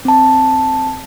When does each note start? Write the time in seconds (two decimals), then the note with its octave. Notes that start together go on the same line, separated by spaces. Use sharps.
0.05 C4 A5